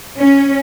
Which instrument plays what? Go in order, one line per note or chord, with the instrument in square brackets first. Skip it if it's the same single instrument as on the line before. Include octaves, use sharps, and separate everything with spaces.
[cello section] C#4